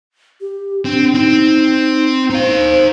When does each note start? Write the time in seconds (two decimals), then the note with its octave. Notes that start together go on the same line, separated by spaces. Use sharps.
0.41 G4
0.85 C4 D4
1.14 C4 D#4
2.30 D#4 C5 F5